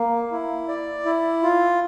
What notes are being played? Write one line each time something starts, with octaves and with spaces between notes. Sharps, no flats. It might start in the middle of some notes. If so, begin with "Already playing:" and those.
Already playing: A#3
E4
D5
E4
F4